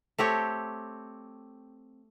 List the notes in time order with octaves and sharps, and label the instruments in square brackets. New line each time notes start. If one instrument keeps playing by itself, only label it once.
[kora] A3 C4 G4 C#5